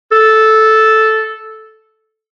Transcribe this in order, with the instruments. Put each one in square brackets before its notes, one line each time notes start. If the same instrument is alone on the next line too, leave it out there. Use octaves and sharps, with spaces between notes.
[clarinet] A4